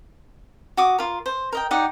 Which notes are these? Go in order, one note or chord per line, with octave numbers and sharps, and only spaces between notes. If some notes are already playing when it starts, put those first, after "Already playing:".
F#4 D6 D#6
F4 A#4
C5
A#4 D#5 G5
D#4 G4 D5 F#5